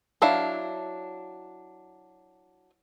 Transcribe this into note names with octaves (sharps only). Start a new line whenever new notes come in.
F#3 D4 E4 F5